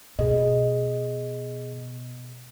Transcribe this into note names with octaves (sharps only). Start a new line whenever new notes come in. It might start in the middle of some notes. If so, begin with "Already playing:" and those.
B2 G#4 D#5